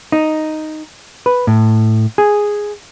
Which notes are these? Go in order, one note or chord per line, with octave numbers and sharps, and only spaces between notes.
D#4
B4
A2
G#4